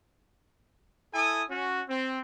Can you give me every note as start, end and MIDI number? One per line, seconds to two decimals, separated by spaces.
1.14 1.43 64
1.14 1.43 69
1.14 1.43 80
1.14 1.43 87
1.50 1.82 61
1.50 1.82 66
1.88 2.19 60